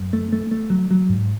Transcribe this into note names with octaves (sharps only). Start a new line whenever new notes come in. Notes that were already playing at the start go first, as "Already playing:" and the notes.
Already playing: F#2
A3
A3
A3
F#3
F#3
G#2